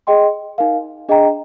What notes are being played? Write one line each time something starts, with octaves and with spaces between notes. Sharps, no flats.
G#4 D#5 G5 C6
D#4 A#4 F5
D4 G#4 D#5 G5 A#5